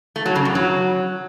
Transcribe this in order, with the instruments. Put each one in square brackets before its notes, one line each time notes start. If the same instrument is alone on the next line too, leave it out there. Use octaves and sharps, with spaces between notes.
[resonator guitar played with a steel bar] A3
F#3
C#3
F#2
F#3